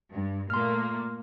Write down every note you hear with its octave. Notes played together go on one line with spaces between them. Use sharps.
G2
A#2 A3 A#3 C6 F6